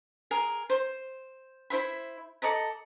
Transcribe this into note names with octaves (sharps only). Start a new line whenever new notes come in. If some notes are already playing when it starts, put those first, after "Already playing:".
G#4 A#4 G#5
C5
E4 C5 E5 B5
A4 D5 D#5 A#5